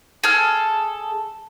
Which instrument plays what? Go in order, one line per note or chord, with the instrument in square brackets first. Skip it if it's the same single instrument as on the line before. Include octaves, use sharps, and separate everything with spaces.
[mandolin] G#4 A4 F6